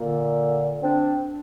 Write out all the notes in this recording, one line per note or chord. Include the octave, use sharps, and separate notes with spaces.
A#2 D3
C4 D4